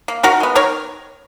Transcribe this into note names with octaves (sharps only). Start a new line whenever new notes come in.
A#3
D#3 F#4 A#4
G#3 B3
D#3 A#4 C#5